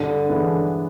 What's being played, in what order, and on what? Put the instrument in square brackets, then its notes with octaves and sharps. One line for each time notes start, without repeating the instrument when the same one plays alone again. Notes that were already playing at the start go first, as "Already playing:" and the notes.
Already playing: [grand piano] G2 [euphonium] D3
[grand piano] E3 G#3 B3 D4